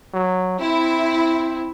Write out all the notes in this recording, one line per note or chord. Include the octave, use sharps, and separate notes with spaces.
F#3
C4 E4